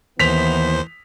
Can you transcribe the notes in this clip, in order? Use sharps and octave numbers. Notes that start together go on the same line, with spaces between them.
D#2 E3 B3 C5 B6 F7